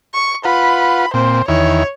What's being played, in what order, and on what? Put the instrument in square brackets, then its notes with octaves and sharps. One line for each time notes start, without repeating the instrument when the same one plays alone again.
[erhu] C#6
[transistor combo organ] F4 B4 F#5 [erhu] B5
[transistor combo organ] A#2 C4 [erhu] C5
[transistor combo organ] E2 D#3 E4 [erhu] C#5